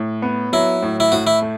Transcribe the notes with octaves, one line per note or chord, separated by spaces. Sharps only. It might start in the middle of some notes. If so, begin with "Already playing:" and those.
Already playing: A2
B3
F#3 E4
A2
E4
A2 F#4
E4
A3